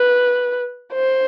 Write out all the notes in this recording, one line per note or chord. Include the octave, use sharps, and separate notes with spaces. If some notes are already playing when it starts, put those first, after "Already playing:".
Already playing: B4
C5